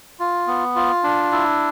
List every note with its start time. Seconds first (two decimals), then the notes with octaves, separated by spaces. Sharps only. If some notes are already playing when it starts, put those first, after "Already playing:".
0.20 F4
0.47 B3
0.76 F4
1.04 D4
1.32 E4